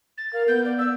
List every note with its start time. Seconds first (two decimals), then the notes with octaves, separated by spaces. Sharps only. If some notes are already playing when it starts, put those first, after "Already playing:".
0.18 A6
0.33 A#4 F5
0.48 B3 G6
0.65 D5
0.79 E6